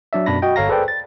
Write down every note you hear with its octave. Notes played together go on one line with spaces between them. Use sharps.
F#3 D4 D5 E5
F#2 B2 D4 B5 A#6
F#4 D#5 G5
G1 A4 C#5 F5 A#5 A#6
G#4 A4 B4 C5 D5 G5
A6